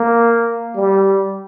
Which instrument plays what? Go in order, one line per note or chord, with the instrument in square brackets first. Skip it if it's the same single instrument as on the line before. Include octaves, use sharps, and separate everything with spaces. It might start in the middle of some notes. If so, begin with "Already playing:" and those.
Already playing: [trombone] A#3
G3